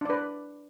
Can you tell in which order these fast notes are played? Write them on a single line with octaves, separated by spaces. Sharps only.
D4 D5 B4